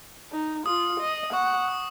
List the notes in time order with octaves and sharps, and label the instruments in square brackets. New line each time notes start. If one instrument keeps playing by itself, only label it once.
[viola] D#4
[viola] F4 [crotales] D#6
[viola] D#5
[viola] F#5 [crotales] C#6
[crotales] D#6